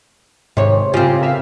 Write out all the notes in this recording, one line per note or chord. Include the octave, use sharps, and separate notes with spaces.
G#2 C3 D#3 C#5
A2 C#3 C4 F4 G4
A#4 E5 F5